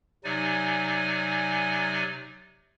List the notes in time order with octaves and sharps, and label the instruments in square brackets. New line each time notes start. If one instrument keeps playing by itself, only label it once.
[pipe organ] C3 F#3 D#4 D5 G#5